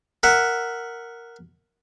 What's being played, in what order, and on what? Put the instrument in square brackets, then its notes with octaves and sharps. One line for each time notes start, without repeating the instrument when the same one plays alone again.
[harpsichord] A#4 E5 F#5